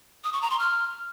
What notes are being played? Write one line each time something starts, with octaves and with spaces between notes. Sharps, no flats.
D#6
C#6
A#5
C6
F6